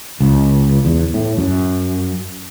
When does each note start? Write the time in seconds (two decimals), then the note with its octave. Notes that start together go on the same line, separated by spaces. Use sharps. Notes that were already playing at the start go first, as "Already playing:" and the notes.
0.21 C#2
0.85 E2
1.14 A2
1.38 F#2